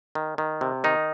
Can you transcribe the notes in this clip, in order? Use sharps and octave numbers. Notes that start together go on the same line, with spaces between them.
D#3
D#3
C3
D#3 D#4